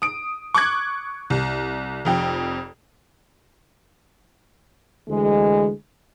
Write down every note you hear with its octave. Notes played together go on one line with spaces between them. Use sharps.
D#6 D7
C#6 D6 F#6 G#6
C2
F1 F2 G5
D2 E3 G#3